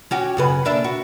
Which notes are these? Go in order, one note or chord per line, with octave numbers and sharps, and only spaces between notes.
C#4 F#4 G4
F#2 C#3 B4
A#3 D4 E5
F#4